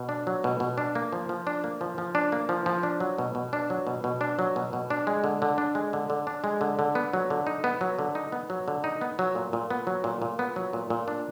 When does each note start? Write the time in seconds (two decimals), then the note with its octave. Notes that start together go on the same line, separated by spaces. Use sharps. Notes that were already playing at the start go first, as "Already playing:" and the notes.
Already playing: B2
0.09 D4
0.27 F#3
0.44 B2
0.60 B2
0.78 D4
0.95 A#3
1.13 F3
1.29 F3
1.47 D4
1.64 A#3
1.81 F3
1.98 F3
2.15 D4
2.32 A#3
2.49 F3
2.66 F3
2.83 D4
3.00 F#3
3.18 B2
3.35 B2
3.53 D4
3.70 F#3
3.87 B2
4.04 B2
4.21 D4
4.39 F#3
4.56 B2
4.73 B2
4.90 D4
5.07 G#3
5.24 D3
5.42 D3
5.58 D4
5.75 G#3
5.93 D3
6.10 D3
6.27 D4
6.44 G#3
6.61 D3
6.79 D3
6.95 B3
7.13 F#3
7.30 D3
7.47 D#4
7.64 B3
7.81 F#3
7.99 D3
8.15 D#4
8.32 B3
8.50 F#3
8.68 D3
8.84 D#4
9.01 B3
9.19 F#3
9.35 A#2
9.53 A#2
9.70 B3
9.87 F#3
10.04 A#2
10.22 A#2
10.39 B3
10.56 F#3
10.73 A#2
10.90 A#2
11.08 D4